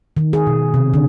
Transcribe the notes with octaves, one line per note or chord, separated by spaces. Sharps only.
D#3
G#4
B2
C3
D3